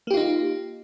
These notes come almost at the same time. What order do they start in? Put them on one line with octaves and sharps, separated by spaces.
A#3 G4 F4 D#4